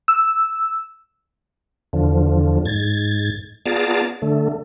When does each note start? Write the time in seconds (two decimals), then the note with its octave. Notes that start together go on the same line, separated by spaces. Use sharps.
0.08 E6
1.93 E2 D3 F3
2.65 G#2 G#6 A6
3.66 B3 F4 G#4 D5 A5 A#5
4.22 D3 A3